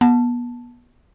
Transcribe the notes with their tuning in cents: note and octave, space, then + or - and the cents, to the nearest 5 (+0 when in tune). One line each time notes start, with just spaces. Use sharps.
B3 -30 A5 +0